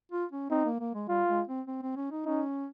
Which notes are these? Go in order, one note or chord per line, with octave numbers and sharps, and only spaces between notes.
F4
C#4
C4 D#4
A#3
A#3
G#3
G3 F4
G#3
C4
C4
C4
C#4
D#4
C#4 D#4